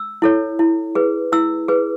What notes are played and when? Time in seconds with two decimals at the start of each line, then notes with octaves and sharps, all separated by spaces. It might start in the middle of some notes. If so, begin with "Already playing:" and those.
Already playing: E6
0.22 E4 A4 C#5
0.59 E4
0.95 G#4 B4
1.32 E4 E6
1.68 G#4 B4